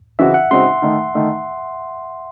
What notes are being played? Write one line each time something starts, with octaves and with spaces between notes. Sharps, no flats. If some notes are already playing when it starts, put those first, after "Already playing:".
C#3 E3 C4 D#4 F#4 E5
F#5
C#3 G#3 C4 D#4 F#4 C6
D#3 A3 D#4
D#3 A3 D#4